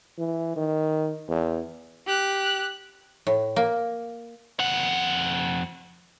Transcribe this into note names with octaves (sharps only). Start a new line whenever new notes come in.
E3
D#3
E2
G4 F#6
A2
A#3
F2 F#5